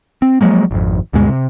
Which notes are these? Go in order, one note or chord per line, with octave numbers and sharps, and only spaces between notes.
C4
F3 F#3 G#3 A#3
G#1 F2
D2 G2 B2 G#3
C3